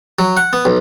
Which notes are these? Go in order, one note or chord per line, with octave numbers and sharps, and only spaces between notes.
F#3
F#5
B3
B1